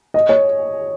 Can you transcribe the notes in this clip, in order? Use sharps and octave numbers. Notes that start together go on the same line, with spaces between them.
D#5
C#5